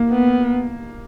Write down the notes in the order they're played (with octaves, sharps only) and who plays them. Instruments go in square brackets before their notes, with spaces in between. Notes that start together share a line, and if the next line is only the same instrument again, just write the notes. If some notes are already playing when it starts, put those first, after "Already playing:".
Already playing: [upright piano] A#3
[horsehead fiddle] B3